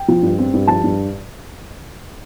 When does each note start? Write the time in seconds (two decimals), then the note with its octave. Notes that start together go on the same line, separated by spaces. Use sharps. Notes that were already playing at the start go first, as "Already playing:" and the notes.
Already playing: G5
0.08 F3
0.22 G2
0.39 C4
0.53 G2
0.68 F3 A5
0.84 G2